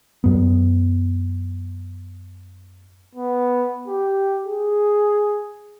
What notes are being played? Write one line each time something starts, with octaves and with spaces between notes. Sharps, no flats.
F#2 B3
B3
G4
G#4